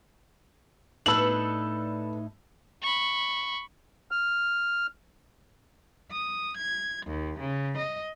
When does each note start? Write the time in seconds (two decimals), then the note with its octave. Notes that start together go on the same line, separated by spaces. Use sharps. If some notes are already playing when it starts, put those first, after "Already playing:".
1.06 A2 D4 D#4 A4 B4 E6 F#7
2.83 B5 C#6
4.11 F6
6.12 D#6
6.57 G#6
7.06 D#2
7.39 C#3
7.78 D#5